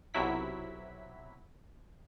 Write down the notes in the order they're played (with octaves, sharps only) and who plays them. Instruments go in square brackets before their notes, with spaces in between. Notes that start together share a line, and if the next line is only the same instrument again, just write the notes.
[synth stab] B1 C3 F#3 E4 B6